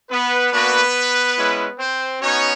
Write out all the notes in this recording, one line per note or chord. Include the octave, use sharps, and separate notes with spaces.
B3 B4
A#3 B3 D4 F#4 B4
G#3 C#4 E4
C4 C5
B3 C#4 D#4 F#4 C#5